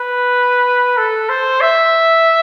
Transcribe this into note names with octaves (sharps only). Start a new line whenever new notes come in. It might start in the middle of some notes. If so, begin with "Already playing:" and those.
Already playing: B4
A4
C5
E5